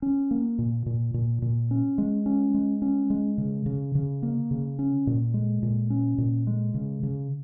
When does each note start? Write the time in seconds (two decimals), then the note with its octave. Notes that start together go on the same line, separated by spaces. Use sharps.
0.02 C#4
0.31 A#3
0.59 A#2
0.86 A#2
1.14 A#2
1.42 A#2
1.71 C#4
1.98 G#3
2.26 C#4
2.54 G#3
2.82 C#4
3.10 G#3
3.38 C#3
3.66 C#3
3.95 C#3
4.23 A#3
4.51 C#3
4.79 C#4
5.07 A#2
5.34 G#3
5.63 A#2
5.90 C#4
6.18 A#2
6.47 G#3
6.74 C#3
7.03 C#3